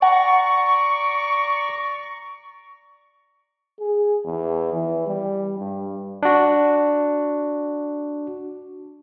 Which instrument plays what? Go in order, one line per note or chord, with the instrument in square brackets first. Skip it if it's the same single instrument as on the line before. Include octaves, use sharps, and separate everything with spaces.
[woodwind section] D5 A#5 C#6 [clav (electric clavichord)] F#5
[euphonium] G#4
E2
E3
G3
G2
[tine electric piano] D4 F#4